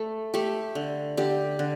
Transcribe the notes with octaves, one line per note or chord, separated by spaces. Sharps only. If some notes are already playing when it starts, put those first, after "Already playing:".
Already playing: A3 A4
A3 G4
D3
D3 G4
D3